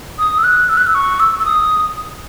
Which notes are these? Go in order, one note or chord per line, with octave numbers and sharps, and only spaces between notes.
D#6
E6
F#6
E6
F#6
E6
C#6
E6
E6
D#6